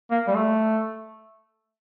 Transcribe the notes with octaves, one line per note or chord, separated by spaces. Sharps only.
A#3
G3
A3